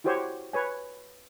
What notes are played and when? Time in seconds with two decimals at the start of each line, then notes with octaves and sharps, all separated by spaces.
0.04 E4 F#4 G4 C5 C#5
0.53 B4 C#5 G#5